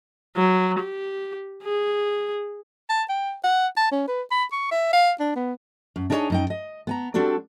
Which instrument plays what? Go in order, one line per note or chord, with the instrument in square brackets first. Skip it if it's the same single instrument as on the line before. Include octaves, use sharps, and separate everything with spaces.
[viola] F#3
G4
G#4
[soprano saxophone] A5
G5
F#5
A5
C#4
B4
B5
C#6
E5
F5
D4
B3
[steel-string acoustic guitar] F#2
D4 D#4 G#4 A4 C#5 D#5
F#2 D#4 G5
D#5
B3 G#5 A#5
G3 C4 D4 F#4 A4 D5